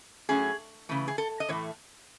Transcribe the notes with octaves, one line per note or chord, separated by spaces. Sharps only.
A2 F#3 A3 C#4 G#4
C#3 E3 A3
G#4
A4
D#5
A2 E3 A3 C#5